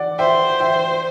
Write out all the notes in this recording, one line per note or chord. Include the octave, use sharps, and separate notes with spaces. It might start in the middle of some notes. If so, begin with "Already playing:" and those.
Already playing: D5 F#5
C5 E5 G5
E5 G5